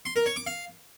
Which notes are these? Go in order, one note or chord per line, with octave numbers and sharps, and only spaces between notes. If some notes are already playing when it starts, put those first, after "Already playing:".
C6
A#4
C#5
D6
F5